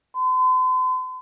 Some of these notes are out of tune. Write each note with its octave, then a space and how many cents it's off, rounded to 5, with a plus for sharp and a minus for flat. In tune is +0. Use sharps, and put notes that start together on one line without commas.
C6 -45